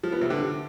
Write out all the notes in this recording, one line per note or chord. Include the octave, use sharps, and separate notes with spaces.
F3
B3
C3
D3